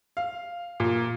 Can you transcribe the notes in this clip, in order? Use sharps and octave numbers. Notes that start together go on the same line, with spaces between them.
F5
A#2